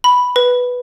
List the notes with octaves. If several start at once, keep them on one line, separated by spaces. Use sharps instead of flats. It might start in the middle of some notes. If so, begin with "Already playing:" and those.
B5
B4